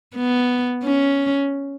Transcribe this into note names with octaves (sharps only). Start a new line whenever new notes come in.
B3
C#4